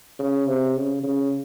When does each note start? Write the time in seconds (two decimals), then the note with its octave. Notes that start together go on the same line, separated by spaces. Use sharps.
0.19 C#3
0.47 C3
0.76 C#3
1.03 C#3